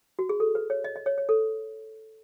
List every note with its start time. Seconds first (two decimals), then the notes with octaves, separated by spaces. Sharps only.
0.19 F#4
0.29 G#4
0.40 A4
0.55 B4
0.70 C#5
0.84 D#5
0.96 D#5
1.06 C#5
1.18 C#5
1.29 A4